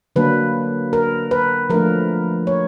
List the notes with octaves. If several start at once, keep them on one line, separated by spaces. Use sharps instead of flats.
D3 F#3 A#3 D4 B4
A#4
B4
F3 A3 D4 A#4
C#5